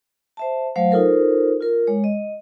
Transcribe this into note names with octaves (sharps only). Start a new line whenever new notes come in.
C5 E5 A5
F#3 A3 C5 F5 F#5
D#4 F4 A4 A#4 C5
F4 A#4
G#3 C#5
D#5